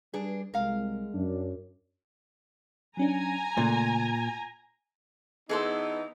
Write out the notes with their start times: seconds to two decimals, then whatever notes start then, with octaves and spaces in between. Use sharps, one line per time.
0.14 G3 D4 G#4 B4
0.54 C2 G#3 A#4 F5
1.14 F#2 D4
2.97 F#3 C#4 D4 G#5 A#5
3.57 A#2 C#3 A3
4.15 A#6
5.49 E3 B3 D#4 G#4 A4 C5